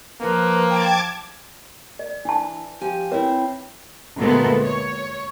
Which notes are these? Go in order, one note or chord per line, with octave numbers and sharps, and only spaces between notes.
F3 A#3 B4
G5 A5 D6 G#6
D5
E3 D4 A5
F3 G4 G#5
C4 E4 B4 C#5
D2 A#2 G#3 B3 A4
C#5